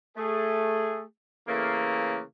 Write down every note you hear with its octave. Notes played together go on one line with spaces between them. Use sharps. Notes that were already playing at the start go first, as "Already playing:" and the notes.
A3 G#4
C#3 E3 A3 A#3